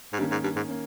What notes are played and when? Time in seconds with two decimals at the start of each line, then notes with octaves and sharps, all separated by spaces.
0.13 G#2
0.20 G2 D#3 A#3 C#4
0.31 G#2
0.44 G2
0.56 G#2
0.68 A#3 C#4